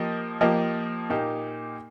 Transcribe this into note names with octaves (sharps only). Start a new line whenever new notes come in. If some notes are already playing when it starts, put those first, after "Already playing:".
Already playing: F3 A#3 G4 A#4 D#5
F3 A#3 G4 A#4 D#5
A#2 A#3 D#4 G4